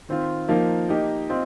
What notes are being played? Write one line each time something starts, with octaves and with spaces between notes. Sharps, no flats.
D#3 C4 F4
F3 A#3 D#4 A#4 F5
A#3 D#4 G4 D#5
C4 F4 D#5